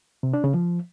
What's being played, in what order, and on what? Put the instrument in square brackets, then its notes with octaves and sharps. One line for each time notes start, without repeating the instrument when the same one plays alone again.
[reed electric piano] C3
D4
C#3
F3